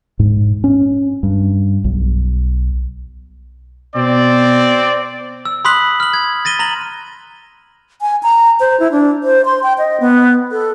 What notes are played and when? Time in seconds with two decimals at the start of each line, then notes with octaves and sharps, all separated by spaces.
0.19 G#2
0.64 C#4
1.23 G2
1.84 B1
3.96 B2 C4 D5
5.45 E6
5.65 B5 C6 D#6 F#6 B6 F#7
6.00 F6 F#7
6.14 G#6
6.45 A6 A#6 D#7 G7
6.59 A#5 A#6 F#7
8.02 G#5
8.23 A#5
8.60 C5
8.80 E4
8.92 D4
9.24 C5
9.45 C6
9.63 G5
9.78 D#5
10.00 B3
10.52 A4